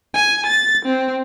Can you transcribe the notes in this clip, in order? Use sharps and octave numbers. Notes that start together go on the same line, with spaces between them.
G#5
A6
C4